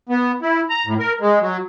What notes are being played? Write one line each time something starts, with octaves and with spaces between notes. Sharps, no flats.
B3
E4
A#5
A2
A#4
G#3
F#3